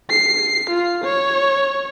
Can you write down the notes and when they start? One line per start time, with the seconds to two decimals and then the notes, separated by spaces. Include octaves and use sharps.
0.10 C7
0.70 F4
1.04 C#5